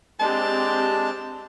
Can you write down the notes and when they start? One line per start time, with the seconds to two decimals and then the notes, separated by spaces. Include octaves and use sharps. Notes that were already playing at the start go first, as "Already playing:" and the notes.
0.20 G#3 C4 D4 G4 A5